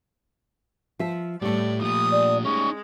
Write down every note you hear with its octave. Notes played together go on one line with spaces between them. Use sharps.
F3 E5
A2 G3 A3 D5
A#2 F3 D#6
D5
G#3 C#4 D#4 C#6